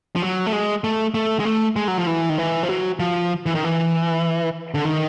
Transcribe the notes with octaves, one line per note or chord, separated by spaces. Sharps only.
F3
F#3
A3
G#3
A3
A3
G#3
A3
G#3
F#3
F3
E3
D#3
E3
F3
F#3
F3
E3
D#3
E3
D3
D#3